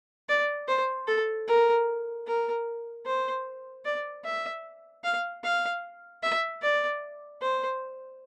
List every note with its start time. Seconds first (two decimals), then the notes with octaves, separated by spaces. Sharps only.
0.29 D5
0.68 C5
1.08 A4
1.48 A#4
2.27 A#4
3.06 C5
3.85 D5
4.24 E5
5.04 F5
5.44 F5
6.22 E5
6.62 D5
7.42 C5